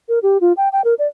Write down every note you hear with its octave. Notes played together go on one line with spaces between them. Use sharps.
A#4
G4
F4
G5
G5
A#4
D5